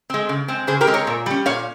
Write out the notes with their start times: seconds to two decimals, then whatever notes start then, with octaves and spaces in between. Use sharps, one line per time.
0.10 G#3 C4
0.29 C#3
0.48 G#3 C4
0.67 C#3 G#4 C5
0.81 G4 A#4
0.87 G#3 C4
0.94 A#4 C#5
1.07 A#2
1.26 G3 C#4
1.46 A#2 C#5 F5